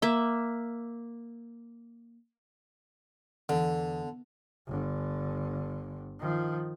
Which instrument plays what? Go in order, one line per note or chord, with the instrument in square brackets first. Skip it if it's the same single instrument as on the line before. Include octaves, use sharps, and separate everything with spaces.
[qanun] A#3 E5
[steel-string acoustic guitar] E2 [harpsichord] D3
[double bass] G1 D3
D#3 F3